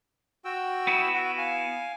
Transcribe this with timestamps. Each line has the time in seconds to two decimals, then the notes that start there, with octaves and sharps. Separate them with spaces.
0.45 F#4 G5 E6
0.87 B3 E4
1.13 F#4
1.38 F5 G#5